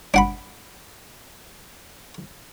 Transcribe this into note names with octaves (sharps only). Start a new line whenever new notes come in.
D4 F#5 B5